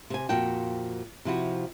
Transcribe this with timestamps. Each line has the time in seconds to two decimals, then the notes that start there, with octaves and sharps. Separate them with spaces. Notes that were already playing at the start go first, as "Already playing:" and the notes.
0.10 C3 G#5
0.29 F2 A#2 F#4 G5 A5
1.25 C3 F3 E4 F#4